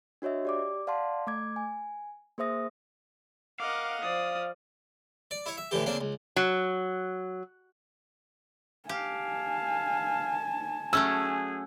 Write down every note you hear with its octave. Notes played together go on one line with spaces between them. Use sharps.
D4 F#4 C#5 D#5 E5
G4 D5 D6
D5 F5 F#5 A5 C6
A3 D6 G#6
G#5
A#3 G#4 C5 E5 D#6 A#6
A#4 D#5 F5 F#5 D6
F3 D5 D#6
D5
E4 C#5
E5
A2 D3 E3 G4
C#3 A#3 C4 D4
C#2
F#3
G4 F5 G#5 A5
F#3 A3 C#4 G#4 E6